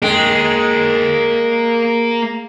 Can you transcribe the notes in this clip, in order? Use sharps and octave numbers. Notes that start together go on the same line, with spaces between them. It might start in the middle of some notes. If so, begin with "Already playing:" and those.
G#3 A#3 G5